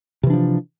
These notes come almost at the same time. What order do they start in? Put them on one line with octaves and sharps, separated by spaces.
C3 E3 D4 F3